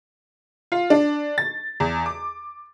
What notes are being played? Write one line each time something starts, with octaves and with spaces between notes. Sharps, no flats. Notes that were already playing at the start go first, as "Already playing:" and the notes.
F4
D4
A6
E2
D6